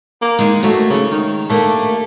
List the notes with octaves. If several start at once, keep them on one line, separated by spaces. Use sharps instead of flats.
A#3
D#3 G#3
D#2 F#3 A3
G#2 C#3 C#5
D#3
A3 A#3 D4 G4